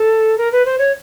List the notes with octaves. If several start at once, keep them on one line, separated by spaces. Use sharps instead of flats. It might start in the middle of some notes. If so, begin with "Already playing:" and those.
Already playing: A4
A#4
B4
C5
C#5